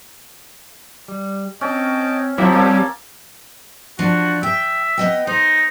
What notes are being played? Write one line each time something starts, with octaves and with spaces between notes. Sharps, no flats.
G3
C4 C#4 D#5 G5 A5
F3 F#3 A#3 C4 E4 G5
G3 A#3 C#5 A5 E6
F3 D4 F#4
E5 G5
B3 D#5 G5
D#4 C5